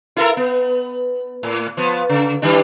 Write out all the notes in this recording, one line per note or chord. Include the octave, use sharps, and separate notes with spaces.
E4 A4 A#4
B3
A2
F3 B3
C#3
D#3 G3 D4